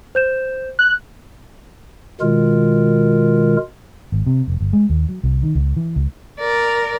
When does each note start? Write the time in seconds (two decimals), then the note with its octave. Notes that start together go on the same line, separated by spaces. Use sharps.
0.15 C5 G6 E7
0.79 F#6
2.21 B2 D#3 G#3 F4 A#4
4.12 G#1
4.27 C3
4.48 F1
4.60 G1
4.73 G#3
4.90 D#2
5.09 F#3
5.24 C2
5.43 D#3
5.55 C#2
5.77 E3
5.96 C#2
6.40 A#4 D5